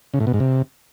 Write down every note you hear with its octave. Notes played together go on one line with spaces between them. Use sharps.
C#3
A2
B2
G#2
C3